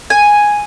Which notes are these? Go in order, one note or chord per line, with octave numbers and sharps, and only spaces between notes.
G#5